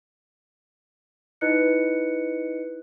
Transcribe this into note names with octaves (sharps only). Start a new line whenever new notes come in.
D#4 E4 B4 D#5 F#6 C#7